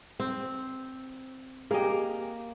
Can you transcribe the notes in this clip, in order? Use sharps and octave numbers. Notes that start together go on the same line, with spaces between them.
C4
A#3 G4 G#4 D#5